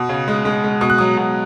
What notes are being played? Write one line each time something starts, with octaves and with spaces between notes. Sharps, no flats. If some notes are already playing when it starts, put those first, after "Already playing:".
Already playing: B2
C#3
G#3
G#3
G#3
B2 D#6
F#6
F#3 D#6
B2